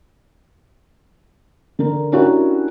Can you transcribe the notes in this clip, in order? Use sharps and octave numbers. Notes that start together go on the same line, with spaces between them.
D3 A#4
C#4 D4 E4 F#4 G4 A#4